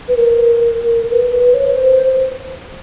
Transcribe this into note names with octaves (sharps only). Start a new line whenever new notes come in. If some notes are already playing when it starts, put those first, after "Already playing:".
B4
A#4
B4
B4
C#5
B4
C5